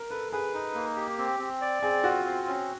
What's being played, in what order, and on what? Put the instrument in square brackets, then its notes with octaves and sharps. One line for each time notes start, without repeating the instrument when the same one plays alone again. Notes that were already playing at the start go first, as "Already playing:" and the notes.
Already playing: [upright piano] A#4
[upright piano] A4 [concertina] B4
[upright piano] G#4 [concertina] B4
[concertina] D#4
A#3
G4
C4
C4
D5
[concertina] C4 [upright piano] G#4
[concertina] F4 [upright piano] F#4
[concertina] C4
C#4